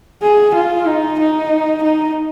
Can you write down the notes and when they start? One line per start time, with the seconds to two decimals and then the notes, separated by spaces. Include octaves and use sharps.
0.23 G#4
0.54 F4
0.87 D#4
1.19 D#4
1.83 D#4